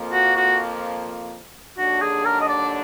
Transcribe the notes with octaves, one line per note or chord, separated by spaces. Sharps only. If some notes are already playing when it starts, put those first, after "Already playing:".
Already playing: F2 F3 A#3
F#4
F#4
D#2 D3 F#3 D4 F#4
G#4
A#4
D#5
D5